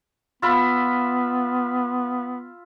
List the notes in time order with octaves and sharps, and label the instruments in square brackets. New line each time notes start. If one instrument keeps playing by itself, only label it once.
[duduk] B3 [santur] F4 E5 B5